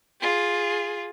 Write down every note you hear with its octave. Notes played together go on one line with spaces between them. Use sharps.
F4 G#4